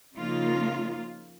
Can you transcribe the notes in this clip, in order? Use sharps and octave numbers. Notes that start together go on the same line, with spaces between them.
C#3 F3 A#3 D#4 F4